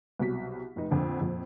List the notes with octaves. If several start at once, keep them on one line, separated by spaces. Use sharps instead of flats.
C2 B2 F#3 B6
F1 D#4
A#1 F2 D3 D4
A#1 F2